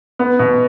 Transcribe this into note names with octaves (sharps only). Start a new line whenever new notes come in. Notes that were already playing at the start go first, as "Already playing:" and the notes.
B3
B2